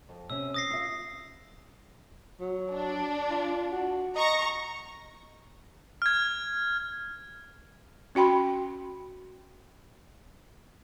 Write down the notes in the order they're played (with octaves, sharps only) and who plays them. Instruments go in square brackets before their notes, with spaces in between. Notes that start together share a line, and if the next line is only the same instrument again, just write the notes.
[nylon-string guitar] F2
[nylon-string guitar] C3 C#4 [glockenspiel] E6
[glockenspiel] D#6 A#6 C7
[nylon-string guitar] F4 E5
[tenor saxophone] F#3
[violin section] D4
[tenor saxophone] F4
F#4
[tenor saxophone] D#5 [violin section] A#5 C#6 A#6
[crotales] F6 G#6
[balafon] C#4 F#4 G5 B5 C6